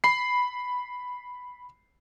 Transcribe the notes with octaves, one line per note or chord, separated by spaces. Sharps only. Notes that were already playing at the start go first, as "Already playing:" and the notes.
B5 C7